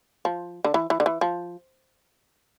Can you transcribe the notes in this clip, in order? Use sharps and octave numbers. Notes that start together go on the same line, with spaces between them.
F3
D3
E3
E3
D3
E3
F3